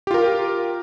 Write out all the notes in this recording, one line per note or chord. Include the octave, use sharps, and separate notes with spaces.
F4 G4 A#4